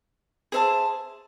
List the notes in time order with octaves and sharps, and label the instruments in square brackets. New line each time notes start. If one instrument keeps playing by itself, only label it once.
[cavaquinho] G#4 C5 E5 A5